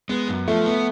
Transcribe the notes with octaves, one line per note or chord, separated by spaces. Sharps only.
G#3 B3
F#2
F3 A3
B3